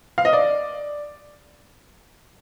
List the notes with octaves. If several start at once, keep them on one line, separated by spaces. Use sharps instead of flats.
F5
D#5
D5